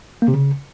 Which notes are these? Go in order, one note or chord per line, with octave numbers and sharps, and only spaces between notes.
A#3
C3
C#3